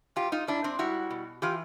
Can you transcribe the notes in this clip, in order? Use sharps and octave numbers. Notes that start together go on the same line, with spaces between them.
G#2 F4 G4
D#4 F4
G#2 D4 E4
C4 D4
G3 E4 F#4
B2
E3 F4 G4